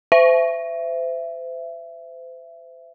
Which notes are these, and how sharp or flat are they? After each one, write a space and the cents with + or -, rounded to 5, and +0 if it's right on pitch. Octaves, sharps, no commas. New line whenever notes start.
C5 -35 E5 +20